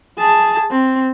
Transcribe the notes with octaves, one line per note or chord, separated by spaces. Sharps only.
G#4 A5
C4